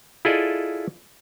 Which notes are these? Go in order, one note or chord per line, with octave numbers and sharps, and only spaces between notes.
E4 F4 G#4 A4 D5 D#5